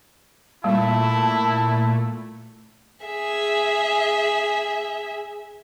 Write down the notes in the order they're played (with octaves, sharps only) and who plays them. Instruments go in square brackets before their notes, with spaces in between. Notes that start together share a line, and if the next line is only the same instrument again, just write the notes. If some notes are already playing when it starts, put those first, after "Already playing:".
[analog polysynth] A#2 A3 [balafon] G3 [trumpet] E4 [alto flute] A5
[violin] G#4 E5